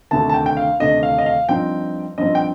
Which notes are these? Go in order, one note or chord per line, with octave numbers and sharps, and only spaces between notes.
D2 C3 D#3 A3 D4 A5
A5
G5
G5
F5
D2 C3 D#3 A3 D4 D#5
F5
D#5
F5
G2 F3 C4 D#4 G5
G2 F3 C4 D#4 D#5
G5